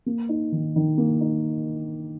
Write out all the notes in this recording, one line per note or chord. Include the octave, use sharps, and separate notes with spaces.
A#3
D#4
D#3
D#3
A#3
D#4